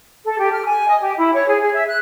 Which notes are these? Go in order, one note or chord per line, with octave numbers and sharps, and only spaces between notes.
A4
G4
F6
G#5
D#5
G4
E4
C#5
G#4
G#4
E5
F#6